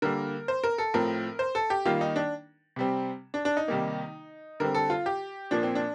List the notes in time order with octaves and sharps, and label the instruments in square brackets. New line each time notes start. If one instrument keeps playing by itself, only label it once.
[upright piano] D3 G3 A#3 A#4
C5
A#4
A4
A2 F3 C4 A#4
C5
A4
G4
D#3 G3 A#3 F4
D#4
D4
C3 G3 C4
D4
D4
D#4
C3 D#3 G3 A#3
D3 G3 C4 A#4
A4
F4
G4
A#2 F3 A#3 D4
C4
D4